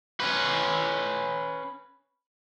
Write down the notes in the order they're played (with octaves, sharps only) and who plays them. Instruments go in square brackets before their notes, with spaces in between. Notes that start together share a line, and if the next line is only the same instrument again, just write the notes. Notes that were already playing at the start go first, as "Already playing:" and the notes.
[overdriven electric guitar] C#4 B4